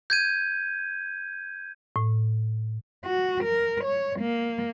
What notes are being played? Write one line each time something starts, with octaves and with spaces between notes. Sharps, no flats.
G6 G#6 D#7
A2
F#4
A#4
C#5
A#3